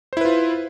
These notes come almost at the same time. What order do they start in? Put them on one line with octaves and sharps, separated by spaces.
C5 E4 B4 F4